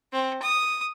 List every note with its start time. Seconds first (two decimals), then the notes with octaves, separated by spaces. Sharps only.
0.12 C4
0.42 D#6